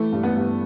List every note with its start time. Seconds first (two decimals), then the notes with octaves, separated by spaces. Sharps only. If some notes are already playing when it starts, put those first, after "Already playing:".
Already playing: E3 A3
0.12 G2
0.23 B3
0.36 G2